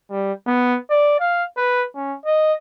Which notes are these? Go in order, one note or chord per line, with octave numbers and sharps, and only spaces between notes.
G3
B3
D5
F5
B4
C#4
D#5